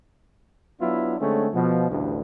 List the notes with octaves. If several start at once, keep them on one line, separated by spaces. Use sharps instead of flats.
F#3 B3 D4 E4 F4
D3 G#3 A3 C4 C#4
B2 F3
A1 D2 G2